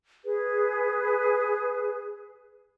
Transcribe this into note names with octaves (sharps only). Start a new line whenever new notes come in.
G#4 B4